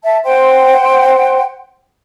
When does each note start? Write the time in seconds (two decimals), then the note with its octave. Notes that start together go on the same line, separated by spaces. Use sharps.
0.04 E5 A5
0.24 C5 F#5 G5 C6